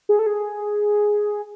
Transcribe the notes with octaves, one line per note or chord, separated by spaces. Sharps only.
G#4
A4
G#4